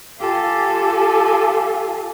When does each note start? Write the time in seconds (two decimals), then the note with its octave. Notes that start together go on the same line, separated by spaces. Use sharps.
0.18 F4 G4 A4 F5 G#5